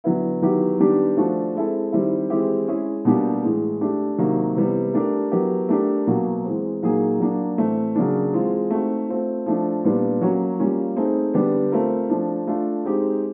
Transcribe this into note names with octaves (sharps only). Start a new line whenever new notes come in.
D3 F#3 B3 E4
D#3 F#3 B3 E4 G4
D#3 G3 B3 D4 G4
F3 A3 D4 F#4
G#3 C4 E4 A4
D#3 G3 C4 E4
E3 G#3 C4 E4 G4
G#3 C#4 E4 G#4
B2 G3 A#3 D4 G4
A2 E3 G#3
A3 D4 G4
C3 D#3 F#3 A#3 D#4
C3 E3 G3 B3
A3 D4 G4 A#4
F#3 B3 E4 G4 A#4
A3 D4 G4 A#4
B2 F#3 A#3
E3 G#3 C4
A#2 F#3 A#3 D#4 G#4
F#3 A#3 D4
A2 E3 A3 C4
C#3 F#3 A#3 D4
E3 G#3 C4 F4
A3 C4 D#4 F#4
A3 C4 F4
F3 A3 D4
A#2 G3 B3 D4
F#3 A#3 C#4 F#4
G3 A#3 C#4 F4
A3 C4 D#4 G#4
D3 G3 B3 D4 G4
A3 C4 F4 A#4
F3 A3 D4
A3 D4 F4 A4
G#3 C4 D#4 G4